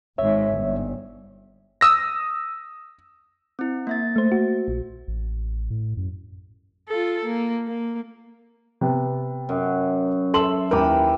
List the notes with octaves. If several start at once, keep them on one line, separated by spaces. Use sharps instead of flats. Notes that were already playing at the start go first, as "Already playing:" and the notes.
G#1 G#2 C#5 E5
G1
D#6 E6 A#6
C4 E4
A#3 E5 A6
A3 C5
F#4
A#1
A1
A2
F#2
F4 A4
A#3
A#3
C3 B3
F#2
A4 E5 C6 F#7
D#2 E3 G4 A#4 B5